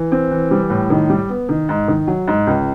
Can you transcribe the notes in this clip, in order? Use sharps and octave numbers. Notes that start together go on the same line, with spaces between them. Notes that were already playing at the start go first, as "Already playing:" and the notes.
Already playing: E3
C4
E3
G3
A2
D#3
G3
B3
D#3
G#2
D#3
F#3
G#2
C#2